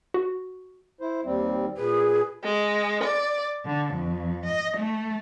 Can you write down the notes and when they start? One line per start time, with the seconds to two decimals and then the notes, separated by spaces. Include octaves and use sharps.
0.14 F#4
1.01 E4 C5
1.25 D#2 G3 C4
1.77 A#2 G#4 B4
2.43 G#3
3.03 D5
3.65 D3
3.94 F2
4.46 D#5
4.78 A3